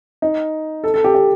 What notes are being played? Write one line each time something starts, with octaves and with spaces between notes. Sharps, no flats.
D#4
A4
A4
G4
G4